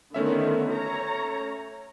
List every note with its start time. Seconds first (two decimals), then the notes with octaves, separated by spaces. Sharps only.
0.14 D3 D#3 A3 B3 C#4 E5
0.72 C#5 A#5